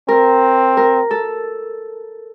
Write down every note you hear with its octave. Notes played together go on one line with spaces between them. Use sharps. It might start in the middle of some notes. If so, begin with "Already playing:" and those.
C4 A#4
A#4
A4